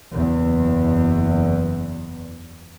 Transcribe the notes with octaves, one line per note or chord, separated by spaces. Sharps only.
F#1 E2